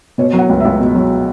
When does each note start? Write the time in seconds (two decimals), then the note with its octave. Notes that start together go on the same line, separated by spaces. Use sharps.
0.18 B2 C#5
0.33 F#3
0.39 F#5
0.49 C#2
0.60 C#2 E5
0.80 B2
0.95 F#3